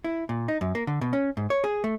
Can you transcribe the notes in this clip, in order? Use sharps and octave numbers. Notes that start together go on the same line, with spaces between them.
E4
A#2
D#4
F#2
A#3
D3
B2
C#4
G#2
C#5
G#4
A3